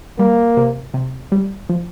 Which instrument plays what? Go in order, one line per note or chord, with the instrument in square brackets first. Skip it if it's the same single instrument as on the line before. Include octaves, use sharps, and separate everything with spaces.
[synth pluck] G3 [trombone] A#3
[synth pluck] C3
C3
G3
F3